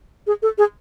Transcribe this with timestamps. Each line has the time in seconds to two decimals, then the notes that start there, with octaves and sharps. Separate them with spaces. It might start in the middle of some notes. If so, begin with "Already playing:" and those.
0.27 G#4
0.42 A4
0.58 G#4